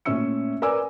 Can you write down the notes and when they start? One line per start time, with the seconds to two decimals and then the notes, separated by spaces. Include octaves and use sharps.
0.05 A#2 A3 C#4 E5 E6 C#7
0.62 A#4 B4 D5 G#5 D6 E6